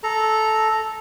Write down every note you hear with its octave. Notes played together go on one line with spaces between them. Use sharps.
A4 A#5